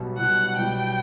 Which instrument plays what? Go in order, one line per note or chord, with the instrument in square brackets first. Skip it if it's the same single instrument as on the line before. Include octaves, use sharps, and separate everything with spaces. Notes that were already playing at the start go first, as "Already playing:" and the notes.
Already playing: [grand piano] B1 B2 G3
[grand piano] B1 B2 G3 [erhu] F#5
[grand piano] B1 B2 G3 [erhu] G5